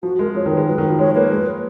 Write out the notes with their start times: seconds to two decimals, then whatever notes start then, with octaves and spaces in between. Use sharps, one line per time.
0.03 F3 F#4
0.19 G#3 A#4
0.35 F3 C#5
0.46 D#3
0.51 B4
0.57 G#3
0.67 F#3 B4
0.78 D#3
0.89 F3
0.99 G#3 C#5
1.15 A#3 B4
1.31 G#3